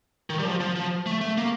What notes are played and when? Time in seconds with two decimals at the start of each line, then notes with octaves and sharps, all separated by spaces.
0.30 D#3
0.39 G3
0.45 F3
0.60 F3
0.75 F3
1.06 A3
1.21 A3
1.38 A#3